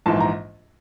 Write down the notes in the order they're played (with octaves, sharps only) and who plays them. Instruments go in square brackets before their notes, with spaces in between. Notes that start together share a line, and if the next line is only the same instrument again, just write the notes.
[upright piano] A#1 G#2 E3 A5
A#5